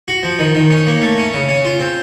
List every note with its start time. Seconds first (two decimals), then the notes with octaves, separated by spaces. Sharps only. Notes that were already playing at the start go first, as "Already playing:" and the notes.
0.08 F#4
0.23 F3
0.39 D#3
0.55 D#3
0.70 C#4
0.87 A#3
1.02 A3
1.18 C#4
1.34 C#3
1.49 C#4
1.65 F4
1.79 C4